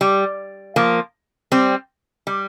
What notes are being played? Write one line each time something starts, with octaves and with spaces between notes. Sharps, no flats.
G3
F3 A#3
G3 C4
G3